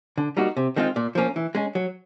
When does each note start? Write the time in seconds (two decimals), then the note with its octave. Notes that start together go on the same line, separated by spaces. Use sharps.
0.18 D3
0.37 G3 A#3 D#4 F#4
0.57 C3
0.76 D#3 G#3 C4 F4
0.96 A#2
1.15 F3 A#3 C#4
1.36 E3
1.55 G#3 C#4
1.75 F#3